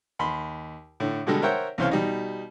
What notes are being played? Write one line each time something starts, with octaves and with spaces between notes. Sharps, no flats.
D#2 B5 C6
A2 D3
B2 D3 G3 G#3 G4 A4
A#4 C5 C#5 E5 F#5 G5
C2 C#3 E3 C5 C#5 F5
B2 G3 D#4